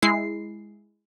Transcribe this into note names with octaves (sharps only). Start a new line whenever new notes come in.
G#3 E4 C7